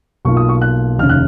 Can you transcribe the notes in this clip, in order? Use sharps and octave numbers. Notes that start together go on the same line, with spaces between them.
B1 B2 A#3 F4 C#6
D#6
C#6
F#6
F1 D#2 C#3 F6
F#6